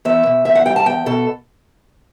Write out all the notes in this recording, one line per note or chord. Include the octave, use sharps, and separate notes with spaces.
E2 E5
B2
E2 E5
F#5
G3 G5
A5
E2 G5
B2 A4